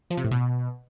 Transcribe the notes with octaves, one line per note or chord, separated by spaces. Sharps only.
F3
C3
A2
B2